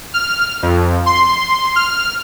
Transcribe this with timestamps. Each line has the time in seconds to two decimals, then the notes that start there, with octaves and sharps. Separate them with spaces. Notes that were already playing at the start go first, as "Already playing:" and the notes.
0.14 F6
0.62 F2
1.06 C6
1.76 F6